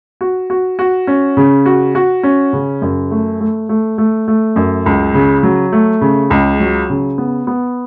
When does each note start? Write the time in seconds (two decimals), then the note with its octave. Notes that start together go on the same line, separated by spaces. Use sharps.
0.21 F#4
0.50 F#4
0.79 F#4
1.07 C#4
1.37 C#3
1.66 F#4
1.95 F#4
2.23 C#4
2.53 C#3
2.82 F#2
3.11 A3
3.40 A3
3.69 A3
3.98 A3
4.28 A3
4.56 F#2
4.86 C#2
5.14 C#3
5.43 F#3
5.72 A3
6.01 C#3
6.30 C#2
6.60 F#3
6.90 C#3
7.18 B3
7.47 B3